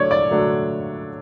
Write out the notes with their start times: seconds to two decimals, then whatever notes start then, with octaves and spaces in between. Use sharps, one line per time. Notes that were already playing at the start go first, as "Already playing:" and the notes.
Already playing: D3 F#3 A3 D4 C#5 D5
0.11 D5
0.31 D3 F#3 A3 D4